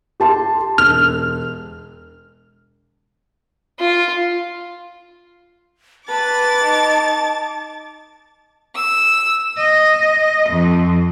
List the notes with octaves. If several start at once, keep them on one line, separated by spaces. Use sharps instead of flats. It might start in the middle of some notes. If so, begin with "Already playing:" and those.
G4 A5 C6
E1 F6
F4
B4 A5 D6 A6
D#4
E6
D#5
F2